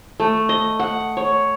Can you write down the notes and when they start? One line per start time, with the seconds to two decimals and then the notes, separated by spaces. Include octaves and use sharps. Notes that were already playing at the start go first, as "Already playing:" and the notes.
0.20 A3
0.49 D#5
0.80 F#5
1.17 C#5